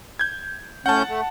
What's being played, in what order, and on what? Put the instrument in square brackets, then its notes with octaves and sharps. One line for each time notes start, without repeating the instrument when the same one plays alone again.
[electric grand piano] G6 G#6
[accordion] A2 C#4 G6 [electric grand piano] F#5 A5
[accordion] A3